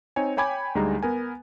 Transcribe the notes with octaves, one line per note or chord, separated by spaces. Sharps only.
C4 D#4 C#5 G#5
C#5 G5 G#5 B5 D6 G#6
D2 G3 G#3 D#4 A#5
B3 A#4 G#5